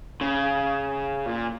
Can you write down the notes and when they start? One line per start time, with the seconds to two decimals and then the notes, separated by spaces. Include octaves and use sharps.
0.21 C#3
1.26 A#2